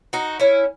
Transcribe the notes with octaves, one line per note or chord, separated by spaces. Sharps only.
D#4 F#4
C#4 E4